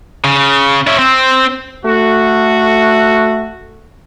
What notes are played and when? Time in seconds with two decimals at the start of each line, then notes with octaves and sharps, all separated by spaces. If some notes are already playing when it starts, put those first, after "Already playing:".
0.24 C#3
0.87 C#4 E5
0.99 C4
1.86 A3 F#4